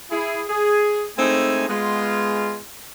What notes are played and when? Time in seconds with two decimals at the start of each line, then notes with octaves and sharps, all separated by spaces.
0.11 E4 G#4
0.49 G#4
1.18 G#3 A3 C4 D#4 E4 G#5
1.69 G#3 B3 F4